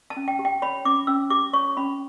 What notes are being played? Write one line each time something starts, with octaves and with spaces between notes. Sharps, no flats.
A5
C#4
G5
G4
G5
C#5 B5
C#4 D6
C#4 E6
G4 D6
C#5 C#6
C#4 B5